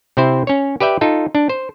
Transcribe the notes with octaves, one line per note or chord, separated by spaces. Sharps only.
C3 C4 E4 C5
C#4 C#5
G4 B4 D5 E5 G5
D#4 F4 A4
D4
C5